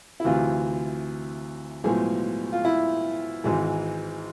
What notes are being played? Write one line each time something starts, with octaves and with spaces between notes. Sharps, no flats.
E4
D2 C3 E3 F4
B1 A2 F3 G#3 G#4
F4
E4
G#1 G#2 E3 G#3